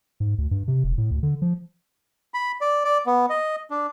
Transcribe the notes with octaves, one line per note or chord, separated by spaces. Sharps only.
G#2
D2
G2
C3
E1
A2
D2
D3
F3
B5
D5
D5
B3
D#5
D4